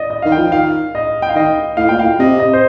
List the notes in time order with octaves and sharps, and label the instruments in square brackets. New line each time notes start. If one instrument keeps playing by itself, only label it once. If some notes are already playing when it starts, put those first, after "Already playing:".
Already playing: [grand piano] D5 D#5
D#5
[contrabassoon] D#3 [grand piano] F5
[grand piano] G5
[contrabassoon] F3
[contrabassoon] D#3 [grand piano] F5
[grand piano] D#5
G5
F5
[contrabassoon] D#3 [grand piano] D#5
[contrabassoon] A2 [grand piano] F5
[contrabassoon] A#2 [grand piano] G5
[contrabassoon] A2 [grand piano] F5
[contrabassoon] C3 [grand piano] D#5
[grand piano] D#5
C5